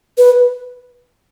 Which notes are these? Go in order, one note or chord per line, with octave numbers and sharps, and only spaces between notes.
B4